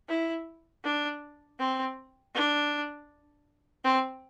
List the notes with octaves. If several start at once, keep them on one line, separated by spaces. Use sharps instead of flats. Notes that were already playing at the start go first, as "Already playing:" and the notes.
E4
D4
C4
D4
C4